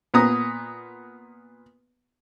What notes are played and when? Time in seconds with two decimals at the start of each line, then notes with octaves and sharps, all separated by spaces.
0.14 A#2 B3 A#5 D#6